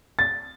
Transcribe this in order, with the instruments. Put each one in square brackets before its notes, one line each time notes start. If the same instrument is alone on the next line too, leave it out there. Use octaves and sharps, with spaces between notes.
[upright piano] A6